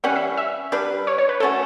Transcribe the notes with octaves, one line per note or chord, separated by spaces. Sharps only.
E3 G3 C#4 F#5
E5
E5
G3 D4 G4 B4
C#5
C#5
B4
A3 C#4 F#4 A4